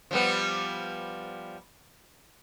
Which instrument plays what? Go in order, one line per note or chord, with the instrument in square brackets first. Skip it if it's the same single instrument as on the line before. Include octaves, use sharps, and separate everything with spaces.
[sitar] F3 G3 B3